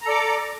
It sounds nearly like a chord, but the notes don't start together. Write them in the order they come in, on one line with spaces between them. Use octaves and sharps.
A#5 A4 D5 D6